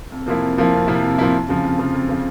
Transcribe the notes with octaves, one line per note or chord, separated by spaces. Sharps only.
F2
C3 F3 A#3 E4
F2
C3 F3 A#3 E4
F2
C3 F3 A#3 E4
F2
C3 F3 A#3 E4
F2
C#3 F3
F2
C#3 F3
F2
C#3 F3